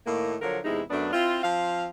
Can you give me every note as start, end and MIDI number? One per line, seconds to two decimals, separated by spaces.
0.06 0.36 45
0.06 0.36 51
0.06 0.36 58
0.42 0.59 50
0.42 0.59 53
0.42 0.59 54
0.42 0.59 70
0.42 0.59 73
0.65 0.81 40
0.65 0.81 48
0.65 0.81 56
0.65 0.81 63
0.65 0.81 64
0.90 1.09 42
0.90 1.09 57
0.90 1.09 59
0.90 1.09 62
1.13 1.41 60
1.13 1.41 64
1.13 1.41 65
1.43 1.86 53
1.43 1.86 60
1.43 1.86 77